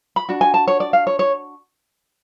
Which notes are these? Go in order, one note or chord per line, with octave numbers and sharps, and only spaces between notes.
B5
D4 F#4
G#5
A5
C#5
D5
F5
C#5
C#5